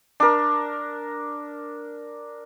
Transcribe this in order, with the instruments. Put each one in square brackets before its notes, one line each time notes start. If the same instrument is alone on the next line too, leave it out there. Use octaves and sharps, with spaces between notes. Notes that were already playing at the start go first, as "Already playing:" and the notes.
[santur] D4 A#4